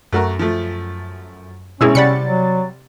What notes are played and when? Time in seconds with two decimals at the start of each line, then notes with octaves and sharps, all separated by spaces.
0.12 F#2 A3 F#4 A#4
0.39 F3 A3
1.81 G#1 B2 G#3 C#4 E4 G#4 E6
1.95 C3 G3 D5 F#5 B5 A6 C#7
2.25 F#3